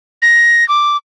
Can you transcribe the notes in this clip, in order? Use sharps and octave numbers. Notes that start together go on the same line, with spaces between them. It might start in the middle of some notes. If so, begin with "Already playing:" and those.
A#6
D6